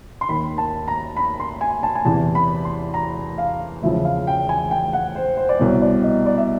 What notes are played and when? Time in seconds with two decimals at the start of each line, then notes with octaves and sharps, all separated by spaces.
0.21 C6
0.29 D#2 D#3 B5
0.58 A5
0.88 A#5
1.17 B5
1.40 C6
1.61 G#5
1.83 A5
1.95 G#5
2.05 E2 C3 E3 A5
2.35 B5
2.65 C6
2.94 A#5
3.38 F5
3.82 E1 E2 C#3 F3 E5
4.05 F5
4.27 G5
4.49 G#5
4.71 G5
4.93 F#5
5.15 C5
5.37 C5
5.49 D5
5.59 C2 B2 C#5
5.82 D5
6.04 D#5
6.26 D5
6.37 E5